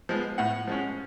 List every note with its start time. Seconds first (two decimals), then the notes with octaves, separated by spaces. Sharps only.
0.09 F3 G#3 B3
0.38 A2 F#5
0.68 F3 G#3 C#4